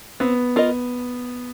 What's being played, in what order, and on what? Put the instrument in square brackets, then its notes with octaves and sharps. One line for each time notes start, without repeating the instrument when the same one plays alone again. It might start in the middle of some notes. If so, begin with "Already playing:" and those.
[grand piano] B3 [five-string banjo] C4
[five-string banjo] F4 A#4 D#5